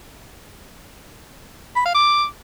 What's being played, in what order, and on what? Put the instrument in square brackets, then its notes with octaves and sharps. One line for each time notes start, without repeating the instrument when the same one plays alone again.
[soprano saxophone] B5
F5
D6